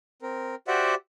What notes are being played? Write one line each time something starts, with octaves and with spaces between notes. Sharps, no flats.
C4 A#4
F#4 G4 C5 D5 E5 F#5